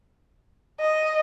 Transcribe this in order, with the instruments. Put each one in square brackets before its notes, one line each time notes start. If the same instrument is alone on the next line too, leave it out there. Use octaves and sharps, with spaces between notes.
[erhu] D#5